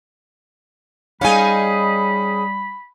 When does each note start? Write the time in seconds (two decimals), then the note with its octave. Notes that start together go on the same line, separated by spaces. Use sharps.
1.21 G3 C#4 D#4 G#4 F5 G#5 B5